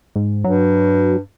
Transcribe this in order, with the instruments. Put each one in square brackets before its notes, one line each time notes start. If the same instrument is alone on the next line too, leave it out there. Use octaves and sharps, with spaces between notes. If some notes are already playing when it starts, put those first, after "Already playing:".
[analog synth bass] G#2
[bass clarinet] G2 [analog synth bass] F#3